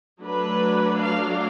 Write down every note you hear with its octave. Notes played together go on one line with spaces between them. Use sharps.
F#3 A3 D4 B4
F5